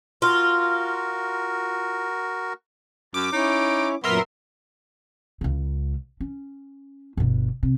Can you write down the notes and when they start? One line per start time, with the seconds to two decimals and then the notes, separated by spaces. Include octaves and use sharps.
0.22 F4 F#4 A#4
3.14 F#2 D6
3.33 C#4 D#4 E4 C#5
4.04 F#2 A#2 F#3 B3 A#4 E5 C6
5.41 C#2 C#3
6.20 C#4
7.17 G1 B2
7.63 C3